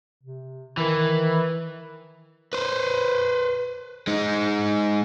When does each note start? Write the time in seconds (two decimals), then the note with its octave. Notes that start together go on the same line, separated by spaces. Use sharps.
0.23 C3
0.77 D#3 E3
2.53 B4 C5
4.07 G#3 D#4